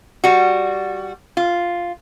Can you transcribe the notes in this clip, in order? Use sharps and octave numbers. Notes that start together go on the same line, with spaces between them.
G3 F#4
F4